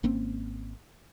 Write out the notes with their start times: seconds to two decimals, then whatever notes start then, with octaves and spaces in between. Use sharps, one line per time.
0.03 G#1 A#3 C4 C#4